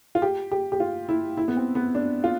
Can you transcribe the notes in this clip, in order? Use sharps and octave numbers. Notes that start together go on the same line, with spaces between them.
F4
G4
G4
G4
F4
E4
E4
B3
C4
B3
D4
F4